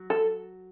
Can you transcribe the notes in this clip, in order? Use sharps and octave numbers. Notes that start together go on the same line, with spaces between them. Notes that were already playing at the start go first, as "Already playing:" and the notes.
Already playing: F#3
A4